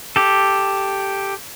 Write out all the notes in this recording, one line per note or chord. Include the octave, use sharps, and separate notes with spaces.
G4 A4